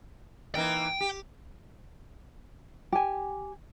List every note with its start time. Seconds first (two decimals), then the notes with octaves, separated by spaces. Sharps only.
0.55 E3 A#3 D#4 G5
1.00 G4
2.92 G4 G#5